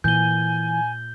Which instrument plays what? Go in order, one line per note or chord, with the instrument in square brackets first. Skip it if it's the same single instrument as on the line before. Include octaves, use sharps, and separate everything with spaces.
[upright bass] A#2 [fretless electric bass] E3 [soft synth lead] G#5 [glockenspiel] G6 G7